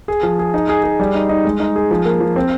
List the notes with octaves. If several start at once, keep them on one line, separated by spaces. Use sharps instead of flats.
G#4
F3
G#4
D#4
G#4
G#4
G3
D#4
D#4
G#3
D#4
G#4
F3
A#3
F3
C4